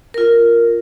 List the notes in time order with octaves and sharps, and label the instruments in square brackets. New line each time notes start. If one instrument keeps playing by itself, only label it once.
[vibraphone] F4 A#4